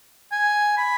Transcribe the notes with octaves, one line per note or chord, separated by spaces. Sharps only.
G#5
B5